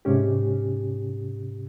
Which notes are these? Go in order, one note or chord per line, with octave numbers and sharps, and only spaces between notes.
G#2 C3 C#4 G4